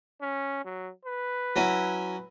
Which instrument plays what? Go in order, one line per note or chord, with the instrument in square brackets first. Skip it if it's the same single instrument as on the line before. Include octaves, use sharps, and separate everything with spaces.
[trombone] C#4
F#3
B4
[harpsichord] F#3 C#4 E4